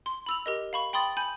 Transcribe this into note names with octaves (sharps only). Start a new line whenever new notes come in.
C6
B5 E6 F7
G4 A#4 D#5
F5 B5 C#6
G5 B5 C6 D#6 A6
G#5 B5 G6